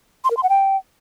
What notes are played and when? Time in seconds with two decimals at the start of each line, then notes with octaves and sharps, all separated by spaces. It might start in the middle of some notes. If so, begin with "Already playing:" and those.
0.24 C6
0.31 A#4
0.37 C6
0.43 F#5
0.49 G5